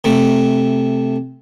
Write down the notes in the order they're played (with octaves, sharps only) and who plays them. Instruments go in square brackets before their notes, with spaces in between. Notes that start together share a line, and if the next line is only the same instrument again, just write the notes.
[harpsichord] C3 A3